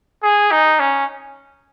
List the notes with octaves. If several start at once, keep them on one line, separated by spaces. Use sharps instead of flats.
G#4
D#4
C#4